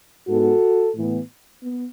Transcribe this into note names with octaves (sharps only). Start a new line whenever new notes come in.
G#2 G#3 B3 F#4 A4
A2 E3 B3
B3